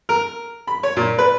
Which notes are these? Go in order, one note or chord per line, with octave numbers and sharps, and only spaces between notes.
A#4
B5
C#5
A#2
B4